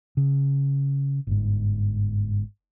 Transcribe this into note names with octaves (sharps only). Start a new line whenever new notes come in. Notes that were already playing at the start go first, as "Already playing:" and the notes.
C#3
G1 G#2